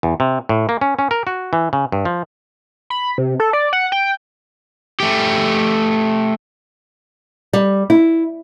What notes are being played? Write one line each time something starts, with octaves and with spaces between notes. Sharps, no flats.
E2
C3
A2
A#3
C#4
C#4
A#4
F#4
E3
C#3
G2
F3
B5
C3
A4
D5
F#5
G5
A3 G4
G3
E4